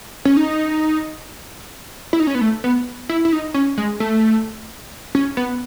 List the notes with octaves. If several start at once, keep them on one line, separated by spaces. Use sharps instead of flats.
C#4
D#4
E4
D#4
C#4
B3
A3
B3
E4
E4
D#4
C#4
G#3
A3
C#4
B3